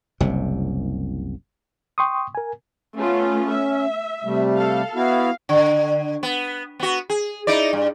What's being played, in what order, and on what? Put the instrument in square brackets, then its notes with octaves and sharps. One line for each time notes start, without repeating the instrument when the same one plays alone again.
[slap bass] F#1 C2 C3
[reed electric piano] G5 C6 C#6 D#6
A#4 G#5
[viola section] A3 B3 F4 [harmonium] C#4
[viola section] E5
[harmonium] C3 G3 A3
[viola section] A4 F5
[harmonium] B3 E4 F#4 [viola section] F5
[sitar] D3
B3
B3 F#4
G#4
D#4 E4 D5
G2